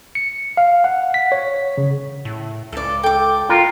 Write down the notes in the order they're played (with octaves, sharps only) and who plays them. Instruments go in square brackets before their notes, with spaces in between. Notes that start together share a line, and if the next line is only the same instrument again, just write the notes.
[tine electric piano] C#7
F5
F#5
B6
C#5
C#3
[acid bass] A2
[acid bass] C#2 [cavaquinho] A4 D5
[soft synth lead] A4 [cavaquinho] G5 D6
[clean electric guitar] F4 A#4 [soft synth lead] G5